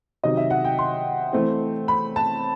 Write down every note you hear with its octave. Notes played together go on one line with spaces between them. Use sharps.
C3 D#3 F#3 D#5
E5
F#5
G5
C6
E3 A3 C4
B5
A5